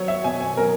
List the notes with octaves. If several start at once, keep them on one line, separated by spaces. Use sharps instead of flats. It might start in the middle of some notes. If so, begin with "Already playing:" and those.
Already playing: F#3 C#5
E5
B2 G#5
G#5
F#3 A#4